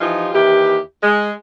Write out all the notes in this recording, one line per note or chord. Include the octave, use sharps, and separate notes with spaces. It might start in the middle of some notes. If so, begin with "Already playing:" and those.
E3 F3 D#4 F4 G4
D#2 E3 E4 G4
G#3